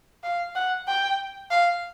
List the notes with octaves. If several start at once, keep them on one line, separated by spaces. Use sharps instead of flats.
F5
F#5
G5
F5